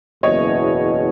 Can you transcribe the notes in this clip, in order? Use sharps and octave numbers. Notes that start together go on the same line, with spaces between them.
F#1 E2 B2 C#5 D#5